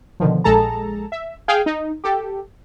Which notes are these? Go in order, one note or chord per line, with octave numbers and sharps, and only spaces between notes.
B2 D3 D#3 F3
A#1 G#3 G#4 A4 A5 A#5
E5
G#4 F5 G5 G#5
D#4
G4 A4